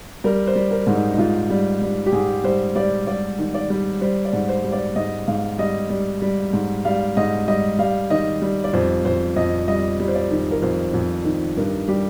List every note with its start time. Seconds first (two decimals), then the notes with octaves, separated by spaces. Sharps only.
0.24 G3 A#4
0.47 C5
0.56 G3
0.71 A#4
0.87 G#2
0.95 D#4
1.13 D#4
1.18 G#2 F4
1.50 G3
1.82 G3
2.06 G4
2.12 G#2 G#4
2.44 G3 C5
2.76 G3 D5
3.07 G3 D5
3.39 D#3
3.54 D5
3.70 G3
4.01 G3 C5
4.25 D5
4.33 G#2
4.49 C5
4.64 G3
4.72 D5
4.96 G#2 D#5
5.27 G#2 F5
5.59 G3 D#5
5.90 G3
6.22 G3
6.53 G#2
6.85 G3 F5
7.17 G#2 D#5
7.48 G3 D#5
7.79 G3 F5
8.10 D#3 D#5
8.42 G3
8.64 D5
8.73 F2 C5
9.05 F2 C5
9.36 F2 D#5
9.68 G3 D#5
10.00 G3
10.08 C5
10.15 D5
10.31 D#3
10.51 A#4
10.62 F2 C5
10.94 F2
11.25 D#3
11.56 G2 A#4
11.88 G3 G4